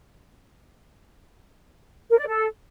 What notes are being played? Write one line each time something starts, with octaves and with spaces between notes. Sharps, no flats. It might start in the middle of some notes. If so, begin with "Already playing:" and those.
A#4
D5
A4